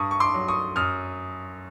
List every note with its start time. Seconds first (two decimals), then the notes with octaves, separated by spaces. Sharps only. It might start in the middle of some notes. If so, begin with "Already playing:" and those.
Already playing: G2 C#6 D#6
0.11 C#6
0.20 C6 D6
0.34 F#3
0.48 C#6 D#6
0.76 F#2 D#6 F6